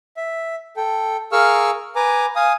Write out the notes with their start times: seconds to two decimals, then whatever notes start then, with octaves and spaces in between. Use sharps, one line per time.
0.17 E5
0.77 A4 G5
1.32 G#4 A#4 F5 C#6 E6 F6
1.96 B4 G#5 A#5 D6
2.36 F5 G#5 D#6